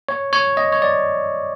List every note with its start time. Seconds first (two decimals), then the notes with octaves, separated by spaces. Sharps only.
0.09 C#5
0.33 C#5
0.57 D#5
0.72 C#5
0.82 D5